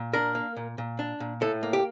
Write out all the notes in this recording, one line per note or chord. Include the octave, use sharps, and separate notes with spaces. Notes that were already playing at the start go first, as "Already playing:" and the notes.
Already playing: A#2
D4 A#4
A#3
A#2
A#2
D4
A#2
A2 A4
A#3
G4